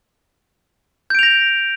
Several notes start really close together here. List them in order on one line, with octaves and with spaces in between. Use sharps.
G6 D7 F7 A#6